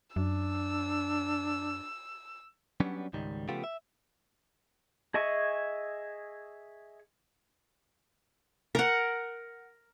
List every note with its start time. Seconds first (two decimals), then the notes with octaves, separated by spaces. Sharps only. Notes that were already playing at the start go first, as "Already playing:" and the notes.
0.16 F#2 D4 E6
2.80 F#3 G3 B3 C#4 D4
3.13 C#2 G#2 D#3 G3
3.49 C#3 F3 A3 B3 F4 G4
3.64 E5
5.14 G#4 D#5 E5 G#5 C#6
8.75 A#4 F#5